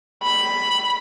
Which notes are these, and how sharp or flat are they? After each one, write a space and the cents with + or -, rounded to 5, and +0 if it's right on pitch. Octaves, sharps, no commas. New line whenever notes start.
B5 +0